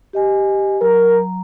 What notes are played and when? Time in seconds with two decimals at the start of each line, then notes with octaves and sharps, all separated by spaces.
0.13 G4 D#5 G#5
0.81 F#3 A#4 A#5